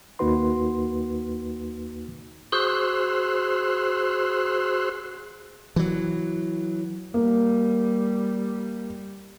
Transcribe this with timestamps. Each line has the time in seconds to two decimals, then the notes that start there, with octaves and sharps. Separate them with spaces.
0.19 D#2 A#3 D#4 F#4 B4 C6
2.52 F#4 G#4 C5 C6 E6 F#6
5.76 E3 F#3
7.14 G3 A#3